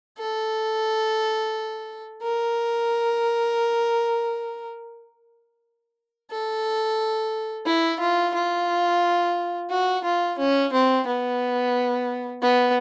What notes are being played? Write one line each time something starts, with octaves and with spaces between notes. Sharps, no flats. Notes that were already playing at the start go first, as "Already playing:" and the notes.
A4
A#4
A4
E4
F4
F4
F#4
F4
C#4
C4
B3
B3